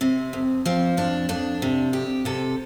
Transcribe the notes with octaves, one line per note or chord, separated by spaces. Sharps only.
C3 C4
F2
F3 C4
F2 D4
F2 D4
C3
F2 G4
C3 A4